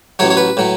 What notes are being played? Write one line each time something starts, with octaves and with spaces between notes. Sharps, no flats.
A1 A2 F#3 C#5
C#5
B4
A2 F#3